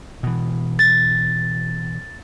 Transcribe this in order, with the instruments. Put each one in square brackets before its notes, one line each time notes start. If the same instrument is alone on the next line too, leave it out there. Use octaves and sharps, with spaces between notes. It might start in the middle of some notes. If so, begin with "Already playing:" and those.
[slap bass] B2 E3
[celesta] A6